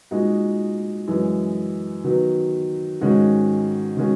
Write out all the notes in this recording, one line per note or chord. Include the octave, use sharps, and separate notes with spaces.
A#2 G#3 D#4 F#4
F#2 E3 G#3
D#3 F#3 B3
G#2 D#3 G#3 C#4 F#4
D#3 G#3 C#4 F#4